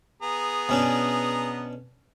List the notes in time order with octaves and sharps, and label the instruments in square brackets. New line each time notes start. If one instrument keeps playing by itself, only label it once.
[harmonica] B3 G#4 A#5
[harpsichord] B2 C#4 D4